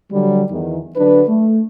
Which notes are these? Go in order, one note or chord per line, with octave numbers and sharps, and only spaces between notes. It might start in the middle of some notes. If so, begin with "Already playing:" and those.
D3 F#3 G3
E2 D#3
D3 F#3 D4 B4
A3